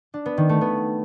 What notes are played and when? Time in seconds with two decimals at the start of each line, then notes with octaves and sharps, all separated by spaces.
0.14 D4
0.26 B3
0.37 D#3
0.49 A3
0.61 B3